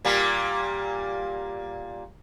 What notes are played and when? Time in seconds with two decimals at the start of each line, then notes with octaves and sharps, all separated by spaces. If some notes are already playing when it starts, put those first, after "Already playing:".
0.05 A#2 G3 A#3